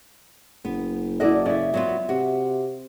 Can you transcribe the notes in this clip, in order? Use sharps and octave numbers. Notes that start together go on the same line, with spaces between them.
F#1 B3
E4 F#4 A4 D5 D#5
C#3 D5 E5
F#3 B3 F4
C3 F#4